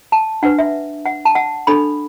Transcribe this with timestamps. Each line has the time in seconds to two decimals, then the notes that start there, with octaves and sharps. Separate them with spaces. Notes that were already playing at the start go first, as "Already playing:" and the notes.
0.12 A5
0.43 D4 B4 F#5
0.58 E5
1.06 F#5
1.25 A5
1.35 F#5
1.67 D4 A4 B5